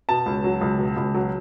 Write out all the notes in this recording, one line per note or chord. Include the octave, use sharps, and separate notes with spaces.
B2 A5
C#2
F#3
C#2
B2
C#2
F#3